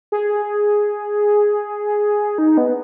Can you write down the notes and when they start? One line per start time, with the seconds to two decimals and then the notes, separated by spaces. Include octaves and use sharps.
0.12 G#4
2.38 D#4
2.57 B3